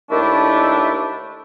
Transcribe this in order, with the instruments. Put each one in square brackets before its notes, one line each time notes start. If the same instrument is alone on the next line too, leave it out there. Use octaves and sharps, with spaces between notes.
[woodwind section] D#2 D#3 A3 D4 E4 G4